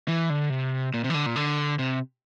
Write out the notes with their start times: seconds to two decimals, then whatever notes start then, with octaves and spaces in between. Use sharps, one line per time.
0.08 E3
0.30 D3
0.50 C3
0.94 A#2
1.04 C3
1.10 E3
1.14 D3
1.26 A#2
1.36 D3
1.79 C3